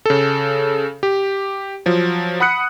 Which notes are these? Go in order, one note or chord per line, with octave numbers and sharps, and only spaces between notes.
C#3 A4
G4
F3 F#3
F#5 B5 D#6 F#6 C#7